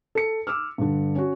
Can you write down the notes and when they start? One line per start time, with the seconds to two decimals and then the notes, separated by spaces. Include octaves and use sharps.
0.15 A4 C#7
0.47 D6 E6 F6
0.78 G2 D3
1.16 C#4 F#4